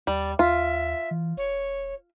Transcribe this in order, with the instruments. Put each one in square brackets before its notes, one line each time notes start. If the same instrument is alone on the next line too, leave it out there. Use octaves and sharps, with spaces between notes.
[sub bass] D#2 [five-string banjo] G3 [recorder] D5
[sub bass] D#2 [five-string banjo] F4 [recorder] E5
[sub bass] E3
[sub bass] E1 [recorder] C#5